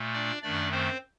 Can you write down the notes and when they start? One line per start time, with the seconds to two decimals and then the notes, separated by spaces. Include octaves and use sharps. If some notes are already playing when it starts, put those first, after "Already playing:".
Already playing: A#2 A3
0.13 D4 D5
0.43 F#2 D#3 A3 D4 D5
0.71 C4 C5